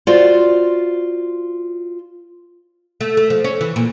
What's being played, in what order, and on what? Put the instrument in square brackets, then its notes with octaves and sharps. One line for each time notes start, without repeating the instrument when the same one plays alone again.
[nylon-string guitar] F4 F#4 C5 D5
[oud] A3
A3
F3
C#4
E3
A#2